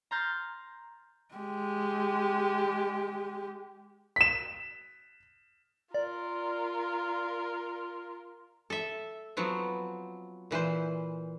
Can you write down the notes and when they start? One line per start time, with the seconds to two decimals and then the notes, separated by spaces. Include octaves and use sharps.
0.11 A#5 C6 F6 G6 A6 A#6
1.35 G#3 G4
4.16 B6 E7
5.94 F4 A#4 D5
8.70 A4 E5
9.37 F3 F#3 B3 C4
10.51 A#2 E3 B4 C5